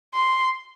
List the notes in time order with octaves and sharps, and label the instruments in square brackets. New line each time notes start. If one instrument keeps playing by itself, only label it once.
[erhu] C6